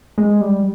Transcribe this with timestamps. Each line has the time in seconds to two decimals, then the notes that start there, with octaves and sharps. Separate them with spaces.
0.18 G#3
0.41 G3